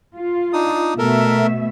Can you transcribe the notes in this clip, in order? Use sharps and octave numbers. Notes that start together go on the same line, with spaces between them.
F4
D4 D#4 D#6
B2 A3 A4 A#4 E5